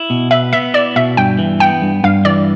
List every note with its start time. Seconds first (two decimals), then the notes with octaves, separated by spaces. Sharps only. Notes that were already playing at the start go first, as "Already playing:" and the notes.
Already playing: E4
0.10 B2
0.31 B4 E5
0.53 B3 E5
0.74 E4 D5
0.96 B2 E5
1.17 G2 G5
1.39 E3
1.60 B3 G5
1.82 G2
2.04 G2 F5
2.25 E3 D5